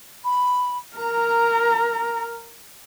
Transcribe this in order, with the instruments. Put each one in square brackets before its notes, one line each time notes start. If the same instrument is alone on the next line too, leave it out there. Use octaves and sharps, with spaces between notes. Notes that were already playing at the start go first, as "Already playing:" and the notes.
[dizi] B5
[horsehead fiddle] A#4 [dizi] A#5